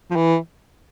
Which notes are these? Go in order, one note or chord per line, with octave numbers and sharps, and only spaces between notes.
F3
E3